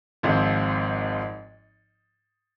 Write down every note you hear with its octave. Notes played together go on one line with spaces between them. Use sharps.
G#1 G#2 F3 C4